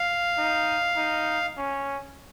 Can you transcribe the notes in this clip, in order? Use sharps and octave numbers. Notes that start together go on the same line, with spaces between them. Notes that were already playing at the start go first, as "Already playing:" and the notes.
Already playing: F5
D#4
D#4
C#4